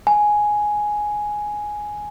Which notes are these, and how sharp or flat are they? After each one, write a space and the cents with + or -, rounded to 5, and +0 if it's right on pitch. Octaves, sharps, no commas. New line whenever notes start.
G#5 +5